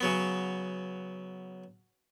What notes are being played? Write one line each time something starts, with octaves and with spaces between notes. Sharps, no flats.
C#3 F#3 B3